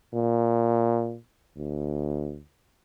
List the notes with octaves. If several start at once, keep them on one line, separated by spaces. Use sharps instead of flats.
A#2
D2